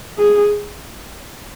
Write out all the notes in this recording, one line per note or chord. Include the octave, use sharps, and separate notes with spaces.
G#4